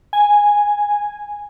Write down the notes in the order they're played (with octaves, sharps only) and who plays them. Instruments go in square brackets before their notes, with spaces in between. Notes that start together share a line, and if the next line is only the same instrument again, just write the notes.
[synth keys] G#5